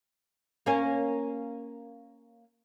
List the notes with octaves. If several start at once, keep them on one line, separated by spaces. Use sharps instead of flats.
A#3 C#4